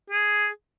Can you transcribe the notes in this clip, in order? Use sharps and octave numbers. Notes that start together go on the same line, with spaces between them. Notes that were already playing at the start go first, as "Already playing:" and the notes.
G#4